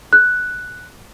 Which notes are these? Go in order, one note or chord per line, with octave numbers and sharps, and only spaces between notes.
F#6